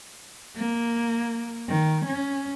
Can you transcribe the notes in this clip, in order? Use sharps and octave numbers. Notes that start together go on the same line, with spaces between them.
A#3
D#3
C#4